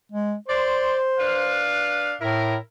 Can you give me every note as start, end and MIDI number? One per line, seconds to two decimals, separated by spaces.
0.12 0.35 56
0.48 1.62 72
0.48 0.97 74
0.48 0.97 84
1.20 2.12 62
1.20 2.12 71
1.20 2.12 77
2.21 2.56 45
2.21 2.55 64
2.21 2.55 70